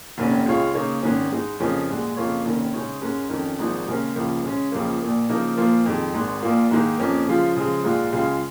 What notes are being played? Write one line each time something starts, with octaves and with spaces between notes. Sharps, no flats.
F1 D#2 D#3 C#4
C#2 C#3 G#3 F4 C#5
C#3 A#3 D#4 C#5
G#1 G#2 D#3 C#4
G#2 G#3 D#4
F2 C#3 F3 C#4 A#4
A#1 G#2 G#3
F2 C#3 A#3 F4 C#5
F1 D#2 D#3 C#4 A#4
C#3 G#3 D#4 C#5
G#2 G#3 C#4 A#4
F2 D#3 C#4 A#4
G#1 G#2 F3 G#3 D#4
D#2 C#3 G#3 C#4 A#4
C#2 C#3 F3 A#3
C#3 G#3 C#4
C#2 C#3 F3 A#3
A#1 A#2 A#3
C#3 F3 A#3 D#4 A#4
A#2 F3 A#3 F4
F2 D#3 G#3
G#1 G#2 G#3
A#1 A#2 A#3 F4
G#2 D#3 A#3 D#4 G#4
F2 F3 A#3 C#4 A#4
C#3 F3 G#3 F4
C#3 F3 G#3
A#1 G#2 G#3 F4
C#2 C#3 G#3 F4 G#4